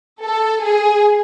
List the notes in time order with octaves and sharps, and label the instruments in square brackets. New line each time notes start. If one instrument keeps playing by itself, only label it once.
[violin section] A4
G#4